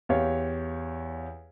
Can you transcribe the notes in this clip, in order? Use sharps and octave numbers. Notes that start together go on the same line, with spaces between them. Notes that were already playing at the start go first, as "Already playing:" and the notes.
E2 G4 C#5 F5